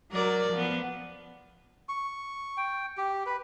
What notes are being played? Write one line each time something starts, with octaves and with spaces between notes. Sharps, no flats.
F#3 A#4 D5
F3 B3
C#6
G5
G4
B4